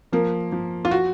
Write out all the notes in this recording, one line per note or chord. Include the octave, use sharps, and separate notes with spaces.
F3 A#3
F3
F4
F#4